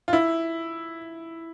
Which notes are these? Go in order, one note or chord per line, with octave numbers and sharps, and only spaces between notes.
F4
E4